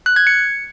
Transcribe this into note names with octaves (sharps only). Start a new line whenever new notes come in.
F#6
G#6
C#7